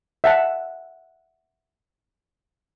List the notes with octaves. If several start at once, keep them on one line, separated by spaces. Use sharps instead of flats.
E5 F#5 A5